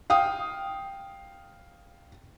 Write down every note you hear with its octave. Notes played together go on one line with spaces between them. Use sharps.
F5 G5 D#6